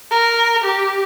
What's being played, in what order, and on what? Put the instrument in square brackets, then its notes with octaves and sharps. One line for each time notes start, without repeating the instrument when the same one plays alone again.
[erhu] A#4
G4